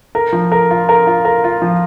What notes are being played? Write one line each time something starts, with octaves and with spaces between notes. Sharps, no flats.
A#4
F3
A#4
F4
A#4
F4
A#4
F4
F3